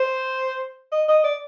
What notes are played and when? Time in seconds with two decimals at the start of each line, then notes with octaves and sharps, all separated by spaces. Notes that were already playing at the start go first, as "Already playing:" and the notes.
Already playing: C5
0.92 D#5
1.08 D#5
1.24 D5